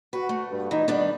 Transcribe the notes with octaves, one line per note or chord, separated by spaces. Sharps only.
F#4 B4
A3
G2
E3 D#4
D#3 G3 B3 D4